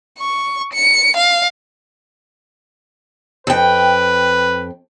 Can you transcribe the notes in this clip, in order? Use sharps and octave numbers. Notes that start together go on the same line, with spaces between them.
C#6
C#7
F5
F2 B4 G5